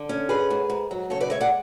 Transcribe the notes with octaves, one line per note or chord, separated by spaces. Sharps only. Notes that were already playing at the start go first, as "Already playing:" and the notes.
Already playing: D3
C#4
G#2 G#4 B4
G#2
G#2
F#3
C#3 A4 C#5
B4 D5
G#3 C#5 E5
D5 F#5